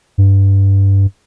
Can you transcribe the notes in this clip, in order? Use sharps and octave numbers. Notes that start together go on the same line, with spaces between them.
G2